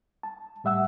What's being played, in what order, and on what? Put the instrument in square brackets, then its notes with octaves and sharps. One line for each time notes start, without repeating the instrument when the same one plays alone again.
[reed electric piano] A5
A2 G3 E5 F#5 E6